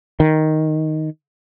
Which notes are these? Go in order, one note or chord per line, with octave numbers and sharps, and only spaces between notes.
D#3